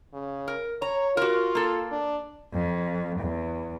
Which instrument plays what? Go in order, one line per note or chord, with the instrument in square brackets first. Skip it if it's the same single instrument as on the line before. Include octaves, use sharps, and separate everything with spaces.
[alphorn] C#3
[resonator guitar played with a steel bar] A#4
[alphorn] C#5 [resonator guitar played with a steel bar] A#5
[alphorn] F4 [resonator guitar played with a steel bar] F#4 A#4
[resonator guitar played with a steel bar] A#3 A4
[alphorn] D4
[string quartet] F2
E2